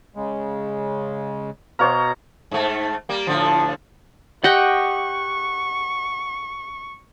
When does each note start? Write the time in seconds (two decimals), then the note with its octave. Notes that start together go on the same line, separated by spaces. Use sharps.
0.16 C#3 G#3
1.79 B2 C5 C#5 F5 A#5
2.51 G#2 A3
3.09 G3 A#3
3.27 A2 D3 F3
4.44 G4 D#5 F#5 G5 C#6